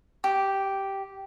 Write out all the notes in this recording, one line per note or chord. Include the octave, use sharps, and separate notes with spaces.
G4